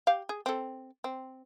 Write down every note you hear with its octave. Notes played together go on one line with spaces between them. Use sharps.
G4 F5
G#4
C4 A4
C4